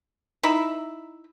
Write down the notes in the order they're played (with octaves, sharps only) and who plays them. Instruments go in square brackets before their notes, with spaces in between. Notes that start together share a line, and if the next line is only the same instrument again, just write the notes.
[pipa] D#4 E4 E5 B5